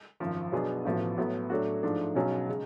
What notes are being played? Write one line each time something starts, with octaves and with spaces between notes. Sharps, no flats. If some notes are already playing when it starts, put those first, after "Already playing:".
G#1 F#2 F3
B2 F#3 B3 D4 G#4
A1 A2 F3 B3 F#4
A2 F#3 B3
A2 F#3 A3 D4 F#4
G#2 F3 A3 D4
B1 B2 F#3 C#4 G#4
C#3 G#3